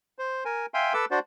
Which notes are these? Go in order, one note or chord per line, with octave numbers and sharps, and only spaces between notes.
C5
A#4 G#5
E5 F5 G5 G#5 C6
A4 B4 D6 E6
D4 F#4 C5 D5